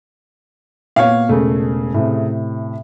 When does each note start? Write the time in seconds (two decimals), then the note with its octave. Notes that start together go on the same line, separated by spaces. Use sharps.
0.96 A#2 A#3 B3 C#5 F5
1.29 E1 C#3 A3
1.94 A2 C3